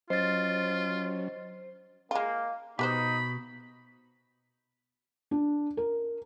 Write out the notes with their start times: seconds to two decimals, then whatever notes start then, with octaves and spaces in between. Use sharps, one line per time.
0.10 F#3 C#4 F4 C5 D#5 A6
2.11 G#3 A#3 F4
2.79 B2 D#4 G4 B4 C5 B5
5.31 D4
5.77 A#4